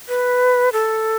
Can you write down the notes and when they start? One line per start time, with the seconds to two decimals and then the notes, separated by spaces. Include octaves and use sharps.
0.09 B4
0.72 A4